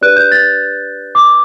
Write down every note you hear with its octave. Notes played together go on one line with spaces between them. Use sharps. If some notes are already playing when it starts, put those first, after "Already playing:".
D4 G4 B4 D5 F#6
G6
A6
D6